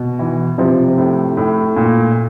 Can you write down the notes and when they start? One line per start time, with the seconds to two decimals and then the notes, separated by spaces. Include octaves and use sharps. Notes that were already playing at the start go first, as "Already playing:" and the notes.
Already playing: B2
0.19 E3
0.58 C3 F3
0.97 A2
1.37 A2
1.76 A#2